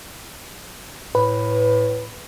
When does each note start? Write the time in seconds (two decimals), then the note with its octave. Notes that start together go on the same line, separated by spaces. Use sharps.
1.15 A2 B4